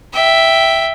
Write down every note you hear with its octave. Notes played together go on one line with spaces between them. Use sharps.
E5 G5